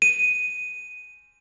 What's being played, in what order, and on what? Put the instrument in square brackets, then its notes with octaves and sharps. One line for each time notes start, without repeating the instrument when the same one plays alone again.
[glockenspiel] D#7